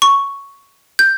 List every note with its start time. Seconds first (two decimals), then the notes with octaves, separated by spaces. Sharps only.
0.02 C#6
0.99 G6